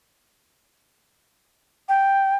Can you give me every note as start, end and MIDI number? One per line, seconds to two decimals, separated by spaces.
1.89 2.36 79